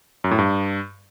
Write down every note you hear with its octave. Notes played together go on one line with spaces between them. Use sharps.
F#2
A2
G2